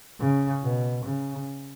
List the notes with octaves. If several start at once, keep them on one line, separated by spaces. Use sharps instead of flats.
C#3
B2
C#3